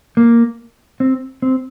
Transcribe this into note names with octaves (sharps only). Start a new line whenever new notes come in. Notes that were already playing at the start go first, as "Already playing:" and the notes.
A#3
C4
C4